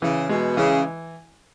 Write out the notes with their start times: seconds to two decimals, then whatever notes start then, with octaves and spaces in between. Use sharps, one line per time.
0.02 C#3 E3
0.29 B2 G#3
0.57 C#3 E3